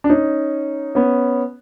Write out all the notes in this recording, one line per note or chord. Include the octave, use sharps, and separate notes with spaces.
D4
C#4 D#4
B3 C#4